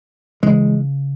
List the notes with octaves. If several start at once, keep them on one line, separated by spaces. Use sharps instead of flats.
C#3 E3 G#3